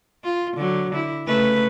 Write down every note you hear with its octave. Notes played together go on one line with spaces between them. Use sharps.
F4
D3 F#3
D3 E4
C#3 A3 B4